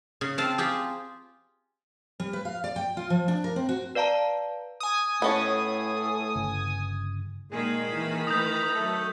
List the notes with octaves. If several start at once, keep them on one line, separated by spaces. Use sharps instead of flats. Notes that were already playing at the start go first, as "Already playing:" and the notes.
C#3
C4 F5 A5 C6
F4 G4 G#4
G3
B4
F5
D5
G5
F4
F3
D4
A#4
C4
F#4
B4 D5 F5 A5 A#5
G#5 D#6
A2 B3 C#4 A5
G1 C#3
A#2 D#3 G#3 A#3 G#4 B5
E3
E3 A3 B4 A#5 D#6 G6
F#3 A3 A4